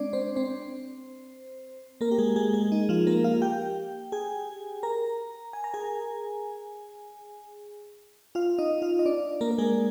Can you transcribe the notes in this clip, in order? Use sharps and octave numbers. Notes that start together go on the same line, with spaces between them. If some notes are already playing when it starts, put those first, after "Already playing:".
Already playing: G#3 C4 D4 D5
C4 C5
C4 C5
A#3 A#4
G4
G#3 G#4
G#3 G#4
G#3 G#4
D#4
F3 F4
A#3 A#4
F4 F5
G4 G5
G#4 G#5
A#4 A#5
G#5
A#5
G#4 G#5
F4 F5
D#4 D#5
F4 F5
D#5
D4 D5
A#3 A#4
A#4
G#3 G#4